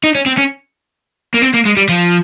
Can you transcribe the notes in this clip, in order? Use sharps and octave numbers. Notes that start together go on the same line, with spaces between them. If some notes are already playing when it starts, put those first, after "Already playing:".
D#4
C#4
C4
C#4
A#3
C4
A#3
G#3
G3
F3